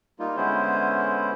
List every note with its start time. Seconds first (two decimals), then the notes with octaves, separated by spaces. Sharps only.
0.19 G3 A#3 D#4 F4
0.37 D3 G#3 B3 C#4 E4 C5